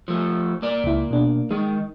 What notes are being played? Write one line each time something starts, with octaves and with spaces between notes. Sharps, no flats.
F3 A3
A#3 D5
C#2 E4
B2 D4
D#3 G#3 D#4